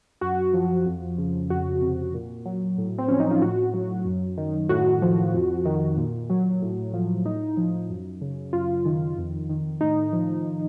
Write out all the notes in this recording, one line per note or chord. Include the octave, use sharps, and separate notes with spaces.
F#2 F#4
F3
F2
C#3
F2 F#4
C3
A#2
F#3
A2
C4
F3 C#4
D#4
F4
A2 F#4
F#3
F#2
D#3
A2 F#4
F3
F2
D#3
A#2
F#3
A2
F3
A2 D#4
F3
F#2
C#3
F#2 F4
D#3
F2
D#3
A2 D#4
F3